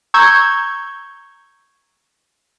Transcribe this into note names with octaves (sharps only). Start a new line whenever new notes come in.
A#5 C#6 E6 G6 G#6